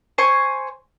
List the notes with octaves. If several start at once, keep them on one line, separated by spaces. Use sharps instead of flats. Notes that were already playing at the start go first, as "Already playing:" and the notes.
C5 G#5 C#6